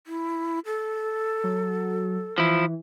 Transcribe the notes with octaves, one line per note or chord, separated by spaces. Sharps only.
E4
A4
F#3
E3 F3 E4